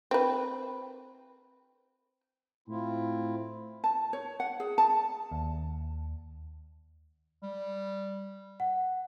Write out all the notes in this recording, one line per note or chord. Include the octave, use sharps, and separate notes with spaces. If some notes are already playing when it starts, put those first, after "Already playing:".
C4 B4
A2 C4 E4 F4
A5
C#5
F#5
G#4
A5
D#2
G3
F#5